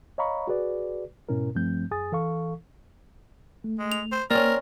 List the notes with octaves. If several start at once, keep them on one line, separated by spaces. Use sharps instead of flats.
C#5 D#5 F5 A#5 B5 C#6
F#4 G#4 B4 D5
G#2 B2 C#4 E4 A#4
G2 F3 A3 C4 G6
F#2 G#4 G#5 D#6 A6
E3 A4 F5 C#6
A3
G#3
F7
C5
A#3 C4 C#4 A#4 D5